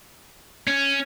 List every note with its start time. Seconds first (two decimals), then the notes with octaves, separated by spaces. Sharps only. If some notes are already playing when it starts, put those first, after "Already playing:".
0.67 C#4